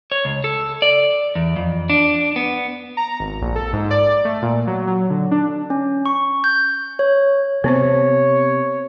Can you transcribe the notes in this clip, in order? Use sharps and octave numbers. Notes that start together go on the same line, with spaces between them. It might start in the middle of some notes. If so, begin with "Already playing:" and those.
C#5
C#2
A4
D5
E2
F2
D4
B3
A#5
G#1
A#1
A4
G#2
D5
A3
A#2
F#3
F#3
D3
D4
C#4
C#6
G6
C#5
C3 B3 C4 C5 C#5